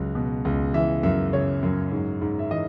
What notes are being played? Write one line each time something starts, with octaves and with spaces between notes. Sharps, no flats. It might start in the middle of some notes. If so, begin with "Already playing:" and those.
Already playing: C#2 F#3
B2
C#2
E3 E5
F#2 E5
C#3 C#5
F#2
G#2
G#2
E5
E3 D#5